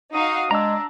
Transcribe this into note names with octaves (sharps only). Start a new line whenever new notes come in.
D#4 F#4 F5 D#6
G#3 D4 A#5 E6